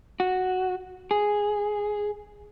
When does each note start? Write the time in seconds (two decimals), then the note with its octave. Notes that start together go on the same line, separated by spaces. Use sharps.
0.20 F#4
1.11 G#4